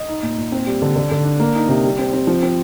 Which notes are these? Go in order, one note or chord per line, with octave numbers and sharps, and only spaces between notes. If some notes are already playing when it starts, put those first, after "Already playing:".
Already playing: D#5
D#4
A#2
A#2
C4
G3
D3
D3
D3
D4
A#3
D#4
C3
G3
C4
C4
F3
C4